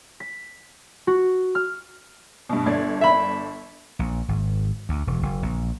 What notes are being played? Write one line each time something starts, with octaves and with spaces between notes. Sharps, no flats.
B6
F#4
F6
G2 B2
G1 D4 G#6
E5 B5
A#1
G#1
D2
E1
F#1
A#1